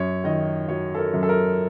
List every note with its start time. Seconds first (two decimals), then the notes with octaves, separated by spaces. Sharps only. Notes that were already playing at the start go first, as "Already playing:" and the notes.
Already playing: F#2 C#5
0.24 D#3 D#5
0.68 F#3 C#5
0.95 A4
0.98 A#4
1.14 F#2
1.23 A4
1.29 A#4